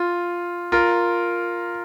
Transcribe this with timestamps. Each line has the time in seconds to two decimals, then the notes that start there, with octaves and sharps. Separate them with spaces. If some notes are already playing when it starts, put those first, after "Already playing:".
Already playing: F4
0.72 F4 A#4